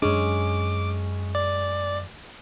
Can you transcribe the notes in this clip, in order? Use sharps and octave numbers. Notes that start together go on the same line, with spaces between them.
F#2 G#3 C#4 D4 D6
D5